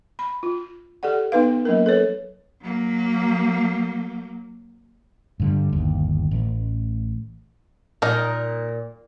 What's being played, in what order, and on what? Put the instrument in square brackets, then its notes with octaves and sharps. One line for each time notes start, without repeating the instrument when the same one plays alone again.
[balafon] B5
F4
G4 A4 D5 F#5
B3 D#4 B4 F5
F#3 A#3 C#4 A#4
A4 B4 C#5
[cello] F#3 A#3
[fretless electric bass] G2 D3 G3
G1 D#2
A1
[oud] A#2 [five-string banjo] D#4 A#4 D#5